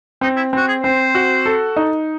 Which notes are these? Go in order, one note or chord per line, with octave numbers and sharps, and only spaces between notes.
C4 D#4
E4
C4 F#4
G#4
C4 C5
F#4
A4
D#4